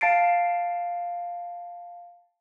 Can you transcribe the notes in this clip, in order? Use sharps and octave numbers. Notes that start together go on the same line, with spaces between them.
F5 A5 A6 C7 D7